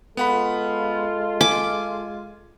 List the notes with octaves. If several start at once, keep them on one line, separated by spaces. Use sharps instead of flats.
G#3 B3 F4 A4 F#5 B5
G#5 D6